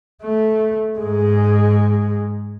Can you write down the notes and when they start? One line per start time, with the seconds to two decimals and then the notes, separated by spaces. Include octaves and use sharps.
0.24 A3
0.97 G#2 G#3